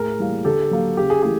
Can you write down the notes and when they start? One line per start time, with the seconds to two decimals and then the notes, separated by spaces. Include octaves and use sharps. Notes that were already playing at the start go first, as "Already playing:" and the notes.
Already playing: A2 G#4 A#4
0.19 E3 G3 A#3
0.45 D3 G4 A4
0.71 F#3 A#3
0.97 C#3 G4
1.10 G#4
1.22 E3 A3 G#4